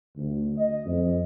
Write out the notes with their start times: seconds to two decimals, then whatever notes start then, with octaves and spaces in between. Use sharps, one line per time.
0.18 D2
0.56 D#5
0.86 F2